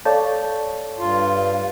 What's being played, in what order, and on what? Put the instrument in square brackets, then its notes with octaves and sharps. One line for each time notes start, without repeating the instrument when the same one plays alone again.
[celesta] A4 F5 G6 [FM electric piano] C#5 D5 A5
[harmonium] G2 F4